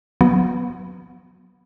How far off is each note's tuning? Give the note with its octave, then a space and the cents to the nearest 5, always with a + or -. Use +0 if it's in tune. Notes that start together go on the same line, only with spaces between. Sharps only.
F#3 -25 B3 -5